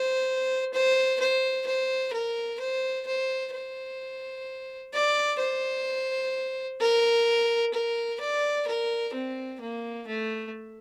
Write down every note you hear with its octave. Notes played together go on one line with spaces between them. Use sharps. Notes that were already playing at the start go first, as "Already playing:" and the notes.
Already playing: C5
C5
C5
C5
A#4
C5
C5
C5
D5
C5
A#4
A#4
D5
A#4
C4
A#3
A3